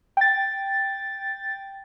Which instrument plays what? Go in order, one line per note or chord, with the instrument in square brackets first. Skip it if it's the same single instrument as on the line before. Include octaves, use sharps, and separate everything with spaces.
[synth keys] G5 A6